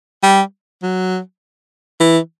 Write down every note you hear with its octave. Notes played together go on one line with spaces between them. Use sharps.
G3
F#3
E3